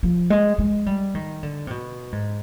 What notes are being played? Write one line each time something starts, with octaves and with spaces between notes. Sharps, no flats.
F3
G#3
G#3
G3
D#3
D3
C3
B2
G#2